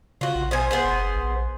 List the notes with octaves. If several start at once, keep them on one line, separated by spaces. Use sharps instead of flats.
C#3 F4 F#4
A#1
B2 C5 G#5
B3 G#4 C5
F#1
A#1